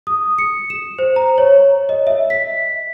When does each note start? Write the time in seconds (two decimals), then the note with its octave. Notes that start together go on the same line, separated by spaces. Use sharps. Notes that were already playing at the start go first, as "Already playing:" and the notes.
0.07 D#6
0.38 C#7
0.70 E7
0.98 C5
1.16 A#5
1.38 C#5
1.89 D#5
2.07 E5
2.30 B6